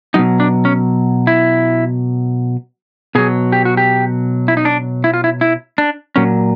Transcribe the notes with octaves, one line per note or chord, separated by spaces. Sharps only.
B2 F#3 D#4
D4
C#4
E4
B2 F#3 G#4
G4
F#4
G4
E4
D#4
D4
E4
F4
E4
E4
D4
A#2 F#3 C#4